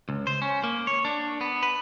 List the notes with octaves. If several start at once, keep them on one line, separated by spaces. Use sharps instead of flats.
C#2
C5
C#4
A#3
C#5
D4
B3
B4